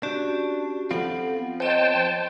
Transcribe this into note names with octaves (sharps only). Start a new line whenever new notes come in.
C#4 D4 F#4 G4
F3 B3 C4 F4 A4 F#5
C5 C#5 D#5 G5 A5